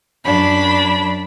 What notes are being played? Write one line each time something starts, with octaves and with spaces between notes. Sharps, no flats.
F#2 D4 B5